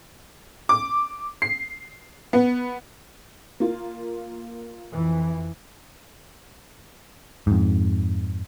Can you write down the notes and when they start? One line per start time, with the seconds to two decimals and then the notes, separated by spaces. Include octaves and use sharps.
0.69 D6
1.42 C7
2.33 B3
3.60 A#3 F4
4.93 F2 E3
7.47 F2 G#2